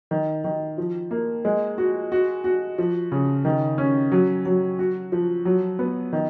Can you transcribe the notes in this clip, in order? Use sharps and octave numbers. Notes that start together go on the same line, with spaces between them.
D#3
D#3
F3
A#3
G#3
F#4
F#4
F#4
F3
C#3
D#3
C#4
F#3
F#3
F#4
F3
F#3
B3
D#3